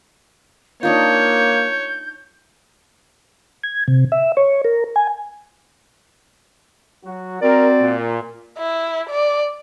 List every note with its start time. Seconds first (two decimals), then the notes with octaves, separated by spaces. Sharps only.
0.83 A#3 D4 D#4 F4 C#5 G6
3.63 G#6
3.88 C3
4.12 E5
4.37 C#5
4.65 A#4
4.96 G#5
7.05 F#3 F#4
7.42 C4 F#4 A#4 D5
7.81 A#2
8.58 E4
9.10 D5